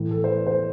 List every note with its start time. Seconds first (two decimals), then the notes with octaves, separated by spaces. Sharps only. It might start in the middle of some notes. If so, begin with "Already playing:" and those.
Already playing: A2 E3
0.11 A4
0.24 C5
0.29 B4
0.47 C5